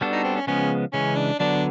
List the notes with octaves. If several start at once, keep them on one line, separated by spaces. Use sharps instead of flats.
G3 B3 D4 F#4 A4
D#4
C4
C#4
C#3 F3 G#3 B3 C#4
C#3 E3 G#3 C#4
D4
D3 F#3 B3 D4